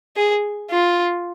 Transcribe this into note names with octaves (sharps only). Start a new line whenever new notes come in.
G#4
F4